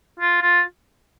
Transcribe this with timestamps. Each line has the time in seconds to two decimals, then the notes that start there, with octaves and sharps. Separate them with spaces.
0.19 F4
0.42 F4